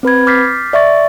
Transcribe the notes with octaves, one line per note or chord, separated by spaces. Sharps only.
C4 B4 B5 G#6
D6 F6 G6 A6 B6 C7
D5 E5 C#6 A6